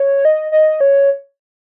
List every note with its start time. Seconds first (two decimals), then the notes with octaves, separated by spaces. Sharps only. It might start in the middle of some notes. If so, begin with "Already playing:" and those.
Already playing: C#5
0.25 D#5
0.52 D#5
0.81 C#5